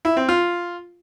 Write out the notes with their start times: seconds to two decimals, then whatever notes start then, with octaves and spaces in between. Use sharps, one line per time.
0.05 E4
0.17 C4
0.29 F4